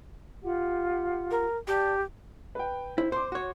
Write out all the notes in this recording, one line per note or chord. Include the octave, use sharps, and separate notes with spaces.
F4 G4 F#5
A#4
G4 D5 A5
B4 G5
E4 C5
C5 C6 D6
F#4 C#5